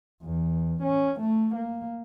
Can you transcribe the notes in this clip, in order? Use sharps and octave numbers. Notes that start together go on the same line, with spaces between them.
E2
C#4
A3
A#3